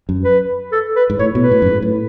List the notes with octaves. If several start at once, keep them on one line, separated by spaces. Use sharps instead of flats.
F#2
B4
A4
B4
G#2
A2 C#5
B2
B4
A2
F#2
G#2
A2